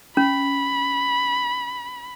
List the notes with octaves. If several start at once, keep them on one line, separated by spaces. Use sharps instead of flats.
C#4 B5